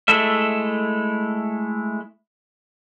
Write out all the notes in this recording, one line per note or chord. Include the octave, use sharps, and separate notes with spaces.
G#3 A3 E4 A4 E5